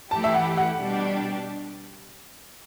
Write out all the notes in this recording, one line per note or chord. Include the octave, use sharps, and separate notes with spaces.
E3 A3 E4 G4 A5
E5
F#5
F#5
B2 G3 D4 G4